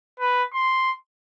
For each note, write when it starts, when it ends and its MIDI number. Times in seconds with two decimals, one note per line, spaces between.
0.20 0.43 71
0.53 0.92 84